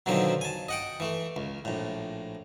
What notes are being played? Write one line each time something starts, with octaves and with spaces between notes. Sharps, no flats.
B2 D3 D#3 F3 F#3 C4
G#5 A5
D#5 F#5 G5
E3 A3
C#2
A#1 A2